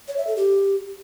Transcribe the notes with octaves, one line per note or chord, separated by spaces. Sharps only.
C#5
E5
A4
G4